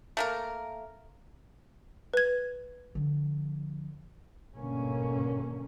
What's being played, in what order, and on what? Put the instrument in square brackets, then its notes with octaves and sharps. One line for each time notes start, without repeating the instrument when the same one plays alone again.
[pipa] A3 A#3 A#4
[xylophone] B4 G#6
[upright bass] D3 F3
[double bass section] G#1 G2 B2 D3 A#3 C#4